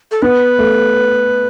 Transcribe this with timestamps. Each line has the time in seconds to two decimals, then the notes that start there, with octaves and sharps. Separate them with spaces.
0.11 A4
0.22 B3 B4
0.59 A3